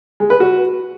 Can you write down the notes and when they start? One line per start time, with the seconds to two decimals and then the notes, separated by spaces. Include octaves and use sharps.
0.20 G#3
0.30 B4
0.40 F#4